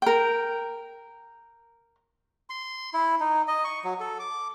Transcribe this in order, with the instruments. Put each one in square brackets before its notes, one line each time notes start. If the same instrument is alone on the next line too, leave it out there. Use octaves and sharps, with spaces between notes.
[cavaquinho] A#4 G5
[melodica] C6
E4
D#4
D#5
C#6
F#3
A4
D6